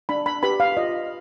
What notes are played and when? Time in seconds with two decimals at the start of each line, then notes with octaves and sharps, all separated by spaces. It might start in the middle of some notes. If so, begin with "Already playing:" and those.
0.09 D4 B5
0.26 B5
0.43 G4 B4 B5
0.60 F5
0.77 F4 D#5